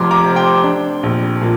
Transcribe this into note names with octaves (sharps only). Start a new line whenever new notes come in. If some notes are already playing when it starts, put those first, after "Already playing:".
Already playing: F1 F2 A#5 C6 D6 F6
A#5 D6
C3
G5 C6
D4
A#1
A#2